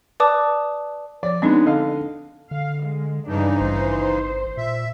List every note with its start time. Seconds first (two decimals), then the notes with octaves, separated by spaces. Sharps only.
0.20 B4 D5 A5 D6 D#6
1.23 F3 C#5 D5
1.42 G#3 B3 C4 D4 D#4
1.66 D3 D#5 F5
2.51 D3 F5
2.85 G#3
3.27 G2 C#3 E3 D4 D#4
3.61 G#1 C5
4.57 A#2 E5